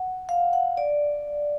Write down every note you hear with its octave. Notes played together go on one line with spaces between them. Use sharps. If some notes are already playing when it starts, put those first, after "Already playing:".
Already playing: F#5
F5
F#5
D5